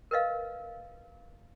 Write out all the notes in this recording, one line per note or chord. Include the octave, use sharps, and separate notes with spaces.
A#4 B4 D#5 F5